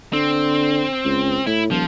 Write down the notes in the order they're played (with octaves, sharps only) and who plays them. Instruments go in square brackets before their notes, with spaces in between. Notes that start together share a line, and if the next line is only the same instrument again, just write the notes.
[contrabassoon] D3 [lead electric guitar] C4
[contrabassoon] C#2
[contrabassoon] A2 [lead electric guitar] E4
[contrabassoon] D#1 [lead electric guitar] F3